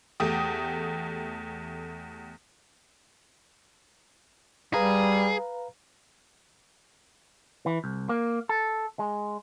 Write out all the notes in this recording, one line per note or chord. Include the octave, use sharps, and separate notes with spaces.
E2 A3 G4 D#6
G3 G#4 B4 F5 A#5
E3
C2
A#3
A4
G#3